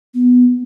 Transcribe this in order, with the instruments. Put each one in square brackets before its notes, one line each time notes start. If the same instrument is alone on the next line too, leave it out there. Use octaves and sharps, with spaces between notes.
[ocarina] B3